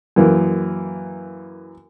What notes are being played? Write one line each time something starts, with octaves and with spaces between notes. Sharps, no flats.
F#2 E3 A#3